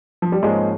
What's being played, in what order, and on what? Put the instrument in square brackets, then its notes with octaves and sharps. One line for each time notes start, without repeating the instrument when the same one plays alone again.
[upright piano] F3
G3
[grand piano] G#2 F3 A#3 C#4 G#4 [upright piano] G#3